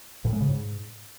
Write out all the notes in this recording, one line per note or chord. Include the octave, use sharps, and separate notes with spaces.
A2
G#3
C#3
G#2